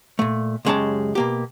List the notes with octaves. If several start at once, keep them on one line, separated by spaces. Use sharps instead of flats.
A#2 A3
C#2 F#2 G#3 C#4 G4 A5
B2 A#3 G4